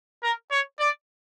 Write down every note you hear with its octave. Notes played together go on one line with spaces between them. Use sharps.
A#4
C#5
D5